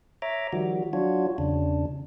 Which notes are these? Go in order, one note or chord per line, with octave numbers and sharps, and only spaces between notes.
C#5 E5 A#5 D6
D#3 F3 G3 F#4
F#3 D4 F4 F#4 C#5
E2 C#3 D4